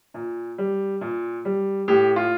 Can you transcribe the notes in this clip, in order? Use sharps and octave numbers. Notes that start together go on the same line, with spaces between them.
A#2
G3
A#2
G3
A2 G4
F4